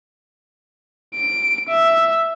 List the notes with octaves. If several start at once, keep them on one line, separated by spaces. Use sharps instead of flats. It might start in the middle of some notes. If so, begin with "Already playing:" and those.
D7
E5